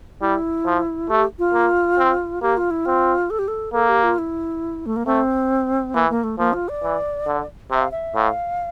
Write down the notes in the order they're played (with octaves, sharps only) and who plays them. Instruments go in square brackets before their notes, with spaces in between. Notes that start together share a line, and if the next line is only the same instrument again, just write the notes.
[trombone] G3 [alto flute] E4
[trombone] F3
[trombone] A3 [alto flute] G4
[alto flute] F4
[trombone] A#3
C4
[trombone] A#3 [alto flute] G4
[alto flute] F4
E4
[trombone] C4 [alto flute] F4
[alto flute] A4
G4
A4
[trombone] A#3 [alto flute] A4
[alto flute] G4
F4
E4
A3
A#3
[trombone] A3 [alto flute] C4
[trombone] E3 [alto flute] A#3
[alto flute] A#3
A3
[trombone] F3 [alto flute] A#3
[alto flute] F4
D5
[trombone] E3
D3
[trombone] C3 [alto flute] E5
[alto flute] F5
E5
[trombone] A2 [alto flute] F5